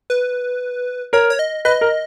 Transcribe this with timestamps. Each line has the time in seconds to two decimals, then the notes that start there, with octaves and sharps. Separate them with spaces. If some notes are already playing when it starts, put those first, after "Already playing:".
0.10 B4
1.13 A#4 C#5
1.30 C#5
1.39 D#5
1.65 B4 D#5
1.81 A#4